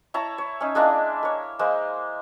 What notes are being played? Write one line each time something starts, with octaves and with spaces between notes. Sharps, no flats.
E4 C#5 A5 A#5
C#5
C#4 D#4
G#3 A#3 D4 E4
A#4 C#5
G#3 A#3 C5